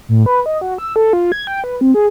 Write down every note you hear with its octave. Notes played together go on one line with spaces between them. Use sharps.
A2
B4
D#5
F#4
E6
A4
F4
G#6
G5
B4
C4
G#4